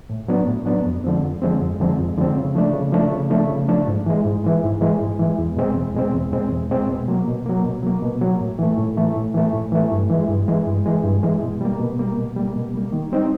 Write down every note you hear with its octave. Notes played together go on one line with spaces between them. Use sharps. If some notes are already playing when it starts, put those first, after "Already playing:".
A2
F#3 B3 D4
A2
F#3 B3 D4
F2
D3 F3 G#3 C4
F2
D3 F3 G#3 C4
F2
D3 F3 G#3 C4
F2
D3 F3 G#3 C4
C#3
F3 A3 D4
C#3
F3 A3 D4
C#3
F3 A3 D4
C#3
F3 A3 D4
G#2
E3 G#3
G#2
E3 G#3
G#2
E3 G#3
G#2
E3 G#3
E2
B2 G#3 C4
E2
B2 G#3 C4
E2
B2 G#3 C4
E2
B2 G#3 C4
B2
F#3 A#3
B2
F#3 A#3
B2
F#3 A#3
B2
F#3 A#3
A2
E3 A3
A2
E3 A3
A2
E3 A3
A2
E3 A3
G2
E3 G#3
G2
E3 G#3
G2
E3 G#3
G2
E3 G#3
B2
G3 A#3
B2
G3 A#3
B2
G3 A#3
B2
G3 A#3
D#3
G3 C4 D#4